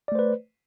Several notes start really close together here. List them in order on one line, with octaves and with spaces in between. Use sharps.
D5 A3 C5 B4